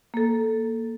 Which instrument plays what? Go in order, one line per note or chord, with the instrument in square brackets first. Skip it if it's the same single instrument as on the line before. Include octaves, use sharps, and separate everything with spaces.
[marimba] A#3 A4